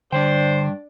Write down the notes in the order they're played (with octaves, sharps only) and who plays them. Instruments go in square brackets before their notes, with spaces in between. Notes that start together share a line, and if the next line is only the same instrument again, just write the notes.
[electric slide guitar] G2 G5 [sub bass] D3 [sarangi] D4 [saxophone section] C5